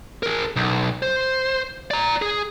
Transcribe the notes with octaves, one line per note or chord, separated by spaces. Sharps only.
G#4 A#4
B1
C5
D5 A#5
G#4